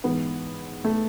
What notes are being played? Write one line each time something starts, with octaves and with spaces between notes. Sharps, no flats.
G#2 E3 B3
A3